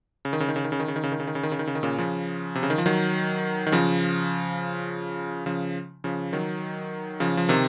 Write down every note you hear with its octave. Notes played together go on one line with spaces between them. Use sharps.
C#3
D#3
C#3
D#3
C#3
D#3
C#3
D#3
C#3
D#3
C#3
D#3
C#3
D#3
C#3
D#3
C#3
D#3
C#3
D#3
A#2 C#3
C#3 F3
C3
C#3
D#3
F3
D#3 F#3
D#3
C#3 F3
C#3 F3
C#3 F3
D#3 F#3
C#3 F3
F3
C3 D#3